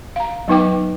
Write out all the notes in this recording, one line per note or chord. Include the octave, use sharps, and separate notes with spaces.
F5 A#5
F#3 B3 D#4 B4 G5 D6